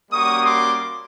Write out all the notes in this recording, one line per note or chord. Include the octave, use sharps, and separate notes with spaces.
G3 A#3 C#4 F#4 C#6 D#6
C6 D6